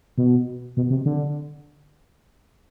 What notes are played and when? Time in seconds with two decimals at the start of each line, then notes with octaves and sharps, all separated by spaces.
0.18 B2
0.77 B2
0.90 C3
1.05 D3